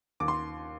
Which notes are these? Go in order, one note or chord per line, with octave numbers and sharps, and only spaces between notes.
D#2 D6
C6